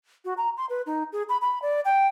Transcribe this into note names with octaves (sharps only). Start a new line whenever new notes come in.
F#4
A#5
C6
B4
D#4
G#4
B5
B5
D5
G5